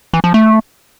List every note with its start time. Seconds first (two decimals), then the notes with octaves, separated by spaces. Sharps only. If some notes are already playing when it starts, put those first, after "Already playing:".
0.14 E3
0.24 F3
0.34 A3